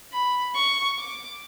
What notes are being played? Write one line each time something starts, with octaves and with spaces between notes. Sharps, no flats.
B5
C#6
D6